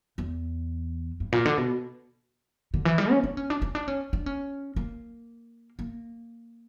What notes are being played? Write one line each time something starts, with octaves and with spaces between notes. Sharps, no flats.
E2
G2
A#2
D3
B2
D3
E3
G3
C#4
D4
C#4
D4
C#4
D4
C#4
D4
C#4
A#3
A#3